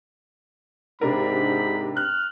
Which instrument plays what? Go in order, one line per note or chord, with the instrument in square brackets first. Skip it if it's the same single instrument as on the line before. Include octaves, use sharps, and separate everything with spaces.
[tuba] G#2 [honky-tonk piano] C3 D4 A#4 [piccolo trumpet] B5
[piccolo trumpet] F6 [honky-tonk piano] F#6